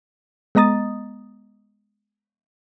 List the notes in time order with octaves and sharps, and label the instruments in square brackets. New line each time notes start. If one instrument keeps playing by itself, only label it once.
[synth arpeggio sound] G#3 B3 D#5 A#5 D#6 A6